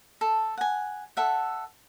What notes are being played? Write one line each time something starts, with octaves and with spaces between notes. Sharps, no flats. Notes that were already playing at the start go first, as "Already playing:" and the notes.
A4
F#5 G#5
A4 E5 F#5